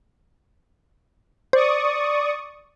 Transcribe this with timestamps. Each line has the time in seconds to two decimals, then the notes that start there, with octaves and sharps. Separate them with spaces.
1.53 C5 D5 C#6 D#6